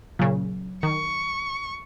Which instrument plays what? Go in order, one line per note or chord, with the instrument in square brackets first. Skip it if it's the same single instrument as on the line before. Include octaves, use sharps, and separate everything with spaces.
[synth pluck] A#2 C#3 [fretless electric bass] F#3
[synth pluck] D#3 [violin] C#6